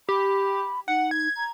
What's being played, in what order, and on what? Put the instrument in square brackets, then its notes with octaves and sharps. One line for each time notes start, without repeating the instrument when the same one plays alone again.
[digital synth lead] G4 [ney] B5
[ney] D#4 [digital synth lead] F#5
[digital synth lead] G#6
[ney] A#5